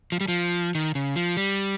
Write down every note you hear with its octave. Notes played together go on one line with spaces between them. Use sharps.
F3
G3
F3
D#3
C#3
F3
G3